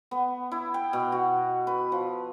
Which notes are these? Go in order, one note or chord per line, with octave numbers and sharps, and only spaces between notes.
B3
E4
G5
B2
F#4
B4
F3